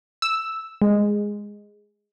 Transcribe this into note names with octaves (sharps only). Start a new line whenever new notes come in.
E6
G#3